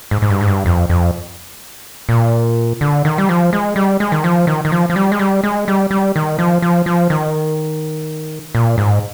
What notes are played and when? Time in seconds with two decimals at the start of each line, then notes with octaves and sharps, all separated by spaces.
0.11 G#2
0.22 G#2
0.30 G2
0.41 G#2
0.48 G2
0.66 F2
0.89 F2
2.09 A#2
2.81 D3
3.05 D#3
3.18 G3
3.29 F3
3.53 G#3
3.76 G3
4.00 G#3
4.12 D#3
4.24 F3
4.47 D#3
4.65 D#3
4.72 F3
4.90 F3
4.96 G3
5.12 G#3
5.19 G3
5.43 G#3
5.68 G3
5.91 G3
6.16 D#3
6.39 F3
6.62 F3
6.86 F3
7.10 D#3
8.55 A#2
8.78 G#2